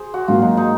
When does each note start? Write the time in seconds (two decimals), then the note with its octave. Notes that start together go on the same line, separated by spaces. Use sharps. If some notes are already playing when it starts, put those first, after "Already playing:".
Already playing: G#4 C5
0.14 F#4
0.28 G#2 F#3 A#3 F4
0.42 D#4
0.57 D#4